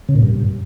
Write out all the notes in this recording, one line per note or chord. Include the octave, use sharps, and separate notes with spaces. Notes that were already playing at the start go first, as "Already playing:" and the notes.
C#3
A#2
G2